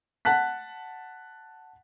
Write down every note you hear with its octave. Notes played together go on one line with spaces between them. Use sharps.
F#5 A5 F#6 B6